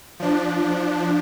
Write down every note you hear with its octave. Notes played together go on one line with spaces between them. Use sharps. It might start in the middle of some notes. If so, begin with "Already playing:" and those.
F3 D4